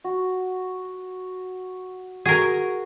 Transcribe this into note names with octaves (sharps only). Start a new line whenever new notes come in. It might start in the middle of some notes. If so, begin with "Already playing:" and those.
F#4
F#4 G#4 A#4